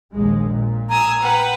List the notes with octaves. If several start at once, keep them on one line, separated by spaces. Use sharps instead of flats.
A#1 D#2 G#3
A#2
G#5 A#5 D#6 E6
B4 F#5 G5